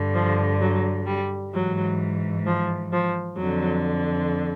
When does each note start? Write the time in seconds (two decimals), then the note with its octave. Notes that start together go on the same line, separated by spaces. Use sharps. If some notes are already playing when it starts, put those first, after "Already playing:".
Already playing: G2 D3
0.14 F3
0.61 F#3
1.06 G3
1.54 G#2 E3 F#3
2.46 F3
2.92 F3
3.38 F2 D3 F#3